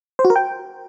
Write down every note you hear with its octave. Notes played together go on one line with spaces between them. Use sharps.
C5
F#4
A#4
G5